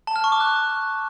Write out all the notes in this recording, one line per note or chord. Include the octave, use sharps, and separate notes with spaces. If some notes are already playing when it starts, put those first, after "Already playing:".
A5
F6
C#6
D6
F#6